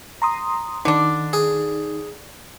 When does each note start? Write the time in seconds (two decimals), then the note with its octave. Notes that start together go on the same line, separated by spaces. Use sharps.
0.22 A#5 C6 D#6
0.85 D3 D#3 D4 D#4
1.33 G#4